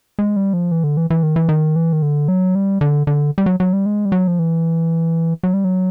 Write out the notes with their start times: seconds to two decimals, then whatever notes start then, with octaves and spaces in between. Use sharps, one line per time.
0.19 G#3
0.36 G3
0.53 F3
0.71 E3
0.84 D3
0.97 E3
1.10 E3
1.23 D#3
1.36 E3
1.49 D#3
1.76 E3
1.93 D#3
2.02 D3
2.28 F#3
2.55 G3
2.81 D3
3.07 D3
3.38 G3
3.46 F#3
3.60 F#3
3.73 G3
3.86 G#3
4.05 G3
4.12 F#3
4.28 F3
4.39 E3
5.43 F#3
5.54 G3
5.64 F#3